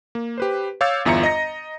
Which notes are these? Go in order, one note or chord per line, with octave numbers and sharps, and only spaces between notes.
A#3
G4 B4 C5
C#5 F5 D6 E6 G6 A6
G1 E2 F4 E5 A#5 C#7
D#5 A#5 A#6